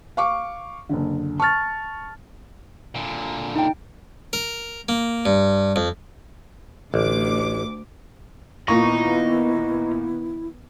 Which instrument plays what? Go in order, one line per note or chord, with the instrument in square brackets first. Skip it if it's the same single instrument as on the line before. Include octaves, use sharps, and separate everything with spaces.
[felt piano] F5 C#6 D6
F#1 D3
[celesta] A5 A6 [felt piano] C#6 F6
[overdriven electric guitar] A#2 D3
[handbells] D#4 G5
[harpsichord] A#4
A#3
G2
F2
[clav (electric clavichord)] A1 [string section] D2 D6
[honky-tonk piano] A#2 A#3 C#6 [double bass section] D#3 B3 [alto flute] E4 [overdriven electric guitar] D#5 A#5